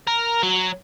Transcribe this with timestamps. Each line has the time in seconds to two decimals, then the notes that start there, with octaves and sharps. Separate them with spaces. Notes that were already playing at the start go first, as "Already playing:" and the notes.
0.07 A#4
0.43 F#3